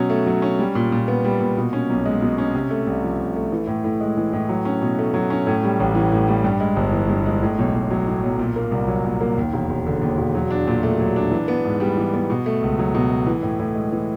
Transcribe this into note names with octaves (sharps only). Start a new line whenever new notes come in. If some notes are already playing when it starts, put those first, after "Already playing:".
Already playing: B2 F#3 C#4
A3
F#3
C#4
G3
A#2
A#2
B3
G3
A#2
B2
C#4
B1
G#3
B2
C#4
C3
A3
C2
F3
C3
A3
E3
A2
A2
G#3
E3
A2
F#3
C#4
B2
A3
F#3
C#4
A2
G3
A1
E3
A2
G3
G2
G#3
G1
E3
G2
G#3
A2
B1
B1
F#3
A2
B1
A#2
A#3
C2
F#3
A#2
A#3
D#2
E1
E1
D3
D#2
E1
F#3
D4
A#2
A3
F#3
D4
E3
B3
G#2
G3
E3
B3
B2
A3
C#2
F#3
B2
A3
E3
A2
A2
G#3
E3